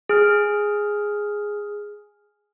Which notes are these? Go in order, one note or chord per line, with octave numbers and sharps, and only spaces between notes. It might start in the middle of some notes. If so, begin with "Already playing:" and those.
G#4 F6